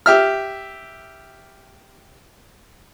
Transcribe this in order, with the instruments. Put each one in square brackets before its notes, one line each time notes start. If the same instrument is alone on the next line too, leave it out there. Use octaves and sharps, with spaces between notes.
[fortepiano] G4 E5 F6